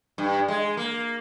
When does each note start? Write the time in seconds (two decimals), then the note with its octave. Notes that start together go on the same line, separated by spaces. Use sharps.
0.18 G2
0.48 G#3
0.77 A#3